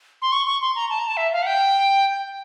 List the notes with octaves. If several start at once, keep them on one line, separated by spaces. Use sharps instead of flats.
C6
C#6
C#6
C6
A#5
A5
A#5
A5
E5
F5
F#5
G5